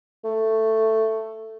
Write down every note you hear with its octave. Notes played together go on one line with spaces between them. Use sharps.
A3